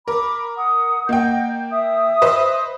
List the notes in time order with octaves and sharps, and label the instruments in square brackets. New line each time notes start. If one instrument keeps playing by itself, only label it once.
[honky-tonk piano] A#4 [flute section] B5 D6
[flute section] F#5 D#6
[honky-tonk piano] A#3 G5 [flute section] D#5 F#5 G6
[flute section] E5 D#6
[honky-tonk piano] B4 C5 D#5